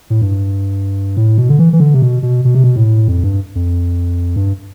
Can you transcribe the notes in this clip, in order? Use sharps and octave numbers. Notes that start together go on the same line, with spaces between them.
A2
G2
A2
B2
D3
E3
E3
D3
C3
B2
B2
B2
C3
B2
A2
F2
G2
F2
G2